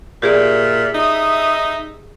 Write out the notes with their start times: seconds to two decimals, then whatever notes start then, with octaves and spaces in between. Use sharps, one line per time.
0.22 A#2 G4 G#4 D5 E5
0.94 D#4 E5 D#6